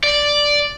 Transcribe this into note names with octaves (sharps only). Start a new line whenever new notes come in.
D5